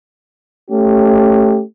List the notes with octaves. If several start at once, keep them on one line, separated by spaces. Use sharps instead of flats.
A3 C#4 G4